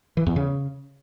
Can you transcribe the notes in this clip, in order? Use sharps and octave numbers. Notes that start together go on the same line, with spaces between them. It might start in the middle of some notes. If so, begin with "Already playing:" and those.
E3
E2
C#3